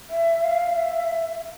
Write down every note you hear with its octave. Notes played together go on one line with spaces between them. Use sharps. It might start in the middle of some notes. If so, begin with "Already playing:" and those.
E5
F5
E5